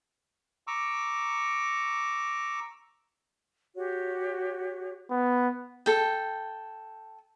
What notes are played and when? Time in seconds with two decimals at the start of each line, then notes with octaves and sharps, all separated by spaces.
0.67 A#5 C#6 D6 E6
3.76 F#4 G4 C#5
5.11 B3
5.86 A4 G5